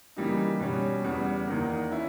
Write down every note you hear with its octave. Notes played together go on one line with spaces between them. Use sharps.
C#3 E3 G3 A#3 D#4
B2 G3 C#4
E2 C#3 G3 B3
E2 D#3 A#3
C#4 E4